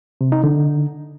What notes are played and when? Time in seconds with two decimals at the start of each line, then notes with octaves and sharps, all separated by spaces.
0.21 C3
0.32 D#4
0.44 D3